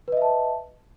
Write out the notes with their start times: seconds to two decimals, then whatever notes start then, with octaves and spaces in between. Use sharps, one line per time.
0.08 B4
0.12 D#5
0.17 E5
0.22 A5